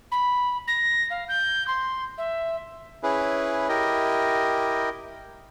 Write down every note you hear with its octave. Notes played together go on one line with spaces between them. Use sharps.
B5
A#6
F5
G6
C6
E5
C#4 E4 G#4 B4
E4 G4 A#4 D#5